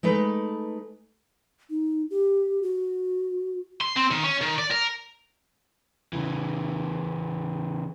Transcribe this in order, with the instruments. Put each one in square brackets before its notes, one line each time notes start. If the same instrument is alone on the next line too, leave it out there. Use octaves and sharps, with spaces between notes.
[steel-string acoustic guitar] G#3 A3 D#4 B4
[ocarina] D#4
G4
F#4
[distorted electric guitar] C6
C4
D#3
C#4
D#3
D5
A#4
[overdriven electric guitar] C#3 E3